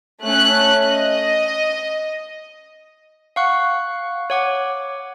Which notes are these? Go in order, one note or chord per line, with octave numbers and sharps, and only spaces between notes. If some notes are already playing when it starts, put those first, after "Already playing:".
A3 C#4 F#6
D#5
F5 F#5 C#6 F#6
C#5 F#5 D6